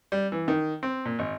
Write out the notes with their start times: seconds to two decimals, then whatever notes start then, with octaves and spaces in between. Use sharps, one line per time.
0.12 G3
0.32 E3
0.48 D#3
0.83 C4
1.05 A#2
1.19 G#1